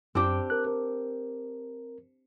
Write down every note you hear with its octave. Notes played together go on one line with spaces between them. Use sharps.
F#2 C4 D4 G4
A#4 F#6
A#4